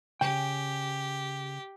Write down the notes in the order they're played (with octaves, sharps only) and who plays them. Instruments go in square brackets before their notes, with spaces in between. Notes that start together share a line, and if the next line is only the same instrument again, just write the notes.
[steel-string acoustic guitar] C#3 G#5 [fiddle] G4 [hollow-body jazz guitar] G5